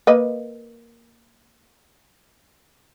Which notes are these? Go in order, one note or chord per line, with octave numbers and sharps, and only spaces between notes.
A#3 B4 D#5